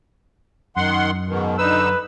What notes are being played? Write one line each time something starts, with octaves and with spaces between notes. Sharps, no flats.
F#2 D#3 F#5 C6
G#2 B2 D#3
D3 D#4 B4 E6